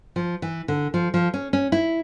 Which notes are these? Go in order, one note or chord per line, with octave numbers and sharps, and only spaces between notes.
F3
E3
D3
F3
F3
C#4
C#4
E4